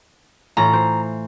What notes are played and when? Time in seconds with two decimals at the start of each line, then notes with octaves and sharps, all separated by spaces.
0.57 A2 E3 F4 A#5
0.73 C5